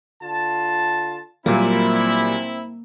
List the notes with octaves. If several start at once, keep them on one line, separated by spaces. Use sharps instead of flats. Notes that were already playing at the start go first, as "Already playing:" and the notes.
D3 F4 A5
A#2 F#3 G3 A#3 C4 E4